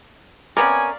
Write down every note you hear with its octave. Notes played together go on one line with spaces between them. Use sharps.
C3 B3 C#4 A#4 D5 F5 G#5